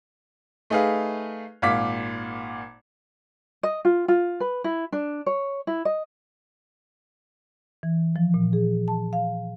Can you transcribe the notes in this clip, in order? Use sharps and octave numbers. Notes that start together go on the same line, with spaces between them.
A3 D#4 G#4 B4 F5
G#1 A#2 F5 D6 B6
D#5
F4
F4
B4
E4
D4
C#5
E4
D#5
E3
F3
A#2
G#4
A5
F5